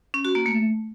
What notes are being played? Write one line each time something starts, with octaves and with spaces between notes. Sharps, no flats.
C#4
F#4
A#3
A3